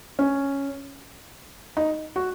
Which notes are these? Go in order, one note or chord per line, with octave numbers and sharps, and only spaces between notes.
C#4
D#4
F#4